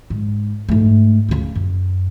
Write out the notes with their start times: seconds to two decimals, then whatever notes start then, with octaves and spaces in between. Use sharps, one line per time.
0.10 G#2
0.69 G#2 A3
1.29 D2 C#3
1.56 F#2